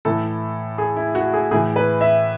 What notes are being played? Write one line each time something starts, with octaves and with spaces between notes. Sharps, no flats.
A2 E3 A4
G#4
E4
F#4
G#4
A2 E3 G#4
B4
E5